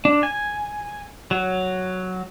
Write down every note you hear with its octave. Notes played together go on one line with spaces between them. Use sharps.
D4
G#5
F#3